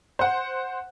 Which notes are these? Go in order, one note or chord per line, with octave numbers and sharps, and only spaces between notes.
C5 F#5